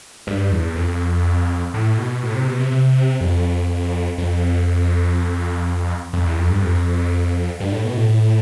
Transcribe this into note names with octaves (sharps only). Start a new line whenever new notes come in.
G2
E2
F2
A2
B2
A2
C3
B2
C3
C3
F2
F2
F2
E2
F2
G2
F2
G2
A2
B2
A2
A2